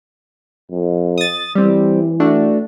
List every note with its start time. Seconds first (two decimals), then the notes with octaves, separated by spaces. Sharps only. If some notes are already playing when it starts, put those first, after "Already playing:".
0.71 F2
1.18 D#6 A6
1.55 E3 G3 C4
2.20 A3 D4 F#4